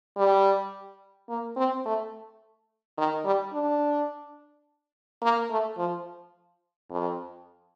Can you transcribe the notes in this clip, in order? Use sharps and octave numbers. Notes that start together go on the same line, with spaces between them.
G3
A#3
C4
A3
D#3
G3
D4
A#3
A3
F3
F2